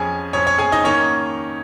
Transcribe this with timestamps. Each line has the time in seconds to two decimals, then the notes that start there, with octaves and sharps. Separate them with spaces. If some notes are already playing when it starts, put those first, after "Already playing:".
Already playing: F2 F3 C#4 G#4 G#5
0.33 F2 F3 C#4 C#5
0.47 C#5
0.58 G#4 G#5
0.72 D#4 D#5
0.84 D#3 A#3 C#4 C#5